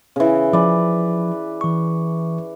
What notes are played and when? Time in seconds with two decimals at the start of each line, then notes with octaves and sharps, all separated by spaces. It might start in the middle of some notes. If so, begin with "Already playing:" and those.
0.16 C#3 E3
0.53 F3 B4 D5
1.61 E3 C#6